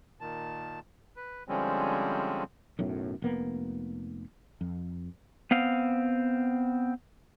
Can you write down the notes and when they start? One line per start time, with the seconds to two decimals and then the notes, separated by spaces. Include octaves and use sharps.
0.20 A#2 D#3 A5
1.16 B4
1.48 D3 F3 G3 G#3 C4 C#4
2.79 B1 F#2 A2
3.22 F1 A#3 B3
4.61 F2
5.51 B3 C4 F5